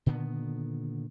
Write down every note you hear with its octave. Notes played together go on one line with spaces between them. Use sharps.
A#2 D3 D#3 B3